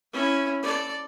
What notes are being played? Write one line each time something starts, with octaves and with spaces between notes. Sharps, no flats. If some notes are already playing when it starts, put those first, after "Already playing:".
C#4 E4
A4 D5